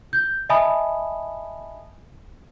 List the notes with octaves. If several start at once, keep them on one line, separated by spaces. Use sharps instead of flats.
G6
D#5 E5 G#5 A5 B5 D#6